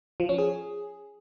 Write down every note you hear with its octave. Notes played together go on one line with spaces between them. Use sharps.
F3
C#4
G#4